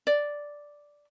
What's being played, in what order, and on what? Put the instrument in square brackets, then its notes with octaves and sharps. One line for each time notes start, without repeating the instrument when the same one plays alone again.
[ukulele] D5